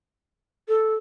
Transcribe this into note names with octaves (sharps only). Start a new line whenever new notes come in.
A4